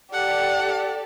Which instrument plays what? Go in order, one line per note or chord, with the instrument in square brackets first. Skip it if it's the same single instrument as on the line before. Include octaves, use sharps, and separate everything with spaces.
[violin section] G4 A4 D5 [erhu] F#5